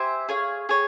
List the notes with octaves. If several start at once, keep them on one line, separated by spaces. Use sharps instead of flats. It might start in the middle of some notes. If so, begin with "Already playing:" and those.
Already playing: G4 C5 E5 G#5
G#4 C#5 F5
G#4 C#5